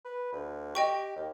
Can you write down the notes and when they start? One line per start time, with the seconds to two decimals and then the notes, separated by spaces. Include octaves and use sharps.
0.05 B4
0.33 D2
0.75 G4 D#5 G5 C#6
1.16 D#2